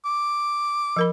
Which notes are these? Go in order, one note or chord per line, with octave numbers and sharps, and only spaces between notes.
D6
F3 A#4 B5